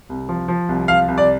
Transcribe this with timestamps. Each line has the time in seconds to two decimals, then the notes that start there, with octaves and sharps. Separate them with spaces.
0.09 C2
0.29 F3
0.48 F3
0.69 C2
0.88 F3 F5
1.08 C2
1.18 D5